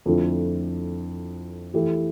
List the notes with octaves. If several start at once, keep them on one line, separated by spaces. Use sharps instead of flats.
F2 D3 F3 A3 E4
E3 A3 E4 G4